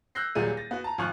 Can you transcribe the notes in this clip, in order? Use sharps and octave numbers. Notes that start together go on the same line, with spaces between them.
E6 F#6 G6 A#6 C7
D#1 A#2 F#3 G3 G#4 D#7
A6 A#6
B3 F#4
A5 A#5
G#1 F3 G#5 C#6 F6 F#6